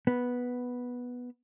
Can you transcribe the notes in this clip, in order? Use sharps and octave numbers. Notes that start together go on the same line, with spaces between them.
B3